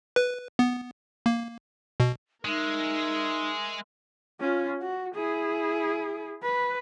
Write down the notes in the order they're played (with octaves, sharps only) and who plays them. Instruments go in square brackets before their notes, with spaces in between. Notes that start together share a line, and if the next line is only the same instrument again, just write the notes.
[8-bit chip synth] B4
B3
A#3
B2
[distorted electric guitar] G#3 [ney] D#4 [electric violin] A#4 E5
[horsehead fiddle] C#4 F4
F#4
E4 G#4
B4